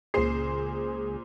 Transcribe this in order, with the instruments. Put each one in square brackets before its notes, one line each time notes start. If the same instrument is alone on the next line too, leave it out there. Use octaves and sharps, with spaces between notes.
[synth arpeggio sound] C#2 G#4 [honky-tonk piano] A#2 C5 C7